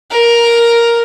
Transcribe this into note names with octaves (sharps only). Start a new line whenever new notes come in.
A#4